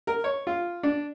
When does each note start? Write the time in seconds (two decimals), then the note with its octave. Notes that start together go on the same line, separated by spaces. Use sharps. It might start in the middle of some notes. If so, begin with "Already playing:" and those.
0.07 A#4
0.24 C#5
0.47 F4
0.83 D4